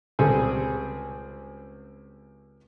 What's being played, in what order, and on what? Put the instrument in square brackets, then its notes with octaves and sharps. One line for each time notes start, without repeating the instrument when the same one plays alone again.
[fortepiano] C#2 G3 C4 G#4 A4 G#5